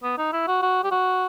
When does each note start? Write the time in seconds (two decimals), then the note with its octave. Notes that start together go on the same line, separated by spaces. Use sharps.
0.03 B3
0.18 D#4
0.33 E4
0.48 F#4
0.62 F#4
0.84 G4
0.92 F#4